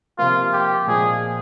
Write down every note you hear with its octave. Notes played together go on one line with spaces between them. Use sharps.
C3 F3 A#3 F4
G4
A#2 F3 G#3 G#4